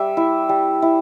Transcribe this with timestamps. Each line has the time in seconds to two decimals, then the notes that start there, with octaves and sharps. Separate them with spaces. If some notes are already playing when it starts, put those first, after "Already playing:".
Already playing: G3 E5
0.17 E4
0.49 G3
0.82 E4